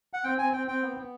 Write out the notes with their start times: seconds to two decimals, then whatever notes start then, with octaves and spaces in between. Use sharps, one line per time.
0.13 F#5
0.24 C4 G5
0.38 C4 G#5
0.53 C4 G5
0.68 C4 G5
0.83 B3
0.97 B3